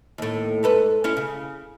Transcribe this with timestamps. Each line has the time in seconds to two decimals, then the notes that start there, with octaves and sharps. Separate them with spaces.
0.18 D#2 A2
0.63 G#2 A4 B4
1.04 C#4 E4
1.17 C#3